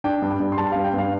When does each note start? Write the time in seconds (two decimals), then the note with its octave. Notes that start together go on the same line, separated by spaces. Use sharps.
0.04 D4 G5
0.22 G2
0.31 G5
0.40 G2
0.52 C6
0.58 G3 A5
0.72 G2 F5
0.84 G5
0.94 G2 F5